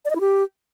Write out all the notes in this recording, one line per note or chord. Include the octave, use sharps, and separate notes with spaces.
D5
D#5
E4
G4